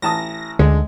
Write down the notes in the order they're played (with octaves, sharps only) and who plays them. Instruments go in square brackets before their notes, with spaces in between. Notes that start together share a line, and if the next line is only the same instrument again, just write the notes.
[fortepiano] A1 A5 D#6 [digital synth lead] A#6
[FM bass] D2 [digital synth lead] D3 [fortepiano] G#3